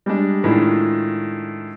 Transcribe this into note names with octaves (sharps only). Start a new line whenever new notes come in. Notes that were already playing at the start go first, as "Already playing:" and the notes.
G3 G#3 D4
A2 D#3 G#3 D4 E4 F4